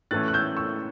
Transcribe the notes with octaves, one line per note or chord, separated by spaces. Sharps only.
A2 E3 A3 C#4 F#6 A6
F#6
E6 G6
C#6 E6